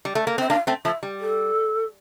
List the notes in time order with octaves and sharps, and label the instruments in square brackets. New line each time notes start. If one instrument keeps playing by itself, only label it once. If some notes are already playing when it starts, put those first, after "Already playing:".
[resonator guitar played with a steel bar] G3
A3
A#3
[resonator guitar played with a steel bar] C4 [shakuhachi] E5
[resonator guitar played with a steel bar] A#3 D4 [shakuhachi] F5
[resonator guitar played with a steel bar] A3 C4
[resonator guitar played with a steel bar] F3 A3 [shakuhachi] E5
[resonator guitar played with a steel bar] G3
[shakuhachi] A4